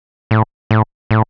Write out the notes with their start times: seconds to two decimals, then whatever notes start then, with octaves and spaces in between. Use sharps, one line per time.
0.31 A2
0.71 A2
1.11 A2